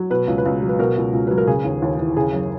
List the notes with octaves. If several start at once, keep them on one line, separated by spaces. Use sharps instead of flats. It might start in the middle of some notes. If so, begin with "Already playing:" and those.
Already playing: F#3
B2 B4
C#2
B4
C#2
F#3
B4
B2 A#4
C#2
C#2
F#3 B4
A#4
C#3 G#4
D#2
D#2
E3
C#3 G#4
F#2